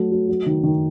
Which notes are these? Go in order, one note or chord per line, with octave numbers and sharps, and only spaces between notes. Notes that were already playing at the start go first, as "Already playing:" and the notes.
Already playing: F#3 A3
F#3
F#3
D#3
D#3